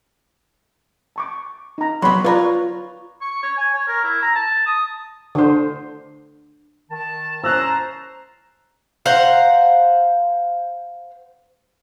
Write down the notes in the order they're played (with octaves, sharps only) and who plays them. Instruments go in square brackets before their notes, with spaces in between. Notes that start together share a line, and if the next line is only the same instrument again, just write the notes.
[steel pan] A5 C#6 D6
D#4 A#5
[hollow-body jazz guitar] F#3 B3 [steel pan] C#5 B5 C6
[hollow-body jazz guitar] F4 C#5 [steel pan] B4 D5 A#5
[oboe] C#6
C#5
G#5
C#5
A#4
E4
A#5
A5
D#6
[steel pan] D3 C5
[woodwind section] D#3 A5
[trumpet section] C#4 A5 A#5 [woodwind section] C5 [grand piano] E6 F#6
[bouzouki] C5 F5 F#5 A#5